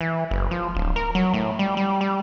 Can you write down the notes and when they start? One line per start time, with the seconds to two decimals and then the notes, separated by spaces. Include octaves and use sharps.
0.01 E3
0.31 F#1
0.51 F3
0.75 D1
0.96 A#4
1.15 F#3
1.34 A2
1.59 G3
1.77 G3
2.01 G3